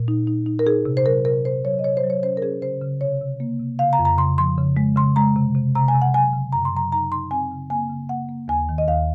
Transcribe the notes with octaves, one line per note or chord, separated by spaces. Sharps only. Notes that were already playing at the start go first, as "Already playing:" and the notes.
Already playing: A#2
D#4
D#4
D#4
A#4
D#4 G#4
C3
C5
F#3 A#4
C3 A#4
C3 C5
F#3 C#5
D#5
C3 C#5
C5
F#3
C#5
C#4 C5
A#4
C#4 G#4
C#3 C5
C#3
C3 C#5
C3
A#3
C3
C#3 F5
A#5
F2
A#5
C#3 C6
F3 C6
C#3
G#3
C#3 C6
G#3 A#5
C3
C3
C3 A#5
G#5
C3
F#5
F#3 G#5
C#3
F#2 A#5
C6
F#3 A#5
D#4 A#5
D#4 C6
C4 G#5
C#3
A#3 G#5
C#3
A#3 F#5
A#3
D#2 G#5
D#3
D#5
D#2 F5